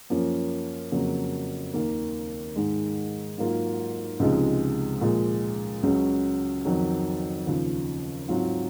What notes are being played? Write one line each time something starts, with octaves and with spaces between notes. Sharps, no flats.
F#2 F3 A#3 C#4
F2 C#3 F#3 A#3
D#2 D#3 A#3
G#2 D#3 G#3
G#2 F#3 A#3 F4
C#2 C3 F3 G#3 D#4
A#2 F3 G#3
C#2 C#3 F#3
F2 D#3 F#3
D#2 C#3 F3
G#2 F#3 C4 F4